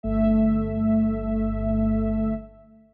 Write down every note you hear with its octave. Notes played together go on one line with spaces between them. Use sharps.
G1 A3 E5